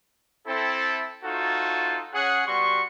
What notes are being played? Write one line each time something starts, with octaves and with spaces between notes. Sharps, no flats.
C4 E4 A4
A3 D#4 F4 F#4 A4 C5
C#4 G#4 F#5
G3 B3 F#4 C6 C#6